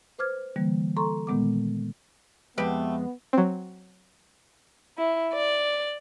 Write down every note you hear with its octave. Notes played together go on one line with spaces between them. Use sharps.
B4 C5 D6 F6 G#6
D3 E3 G3 A#3
A4 A#5 C6 C#6
A#2 D#3 G#3 B3 F#5 D6
F2 G#3 A3 B3 G4 B4
F#3 C4
E4
D5